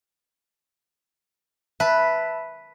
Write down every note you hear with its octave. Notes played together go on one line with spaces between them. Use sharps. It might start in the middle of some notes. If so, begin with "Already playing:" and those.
B4 E5 A5 B5